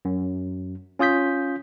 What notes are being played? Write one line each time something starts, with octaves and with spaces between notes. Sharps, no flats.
F#2
C#4 F4 D#6 G6 B6